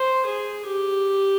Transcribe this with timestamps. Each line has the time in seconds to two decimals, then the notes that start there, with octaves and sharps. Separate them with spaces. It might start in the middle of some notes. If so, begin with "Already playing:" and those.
Already playing: C5
0.26 G#4
0.65 G4